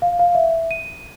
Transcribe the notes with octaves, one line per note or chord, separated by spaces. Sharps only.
F5
F5
E5
D#7